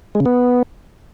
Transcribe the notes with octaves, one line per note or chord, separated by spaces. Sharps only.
G#3
C#3
B3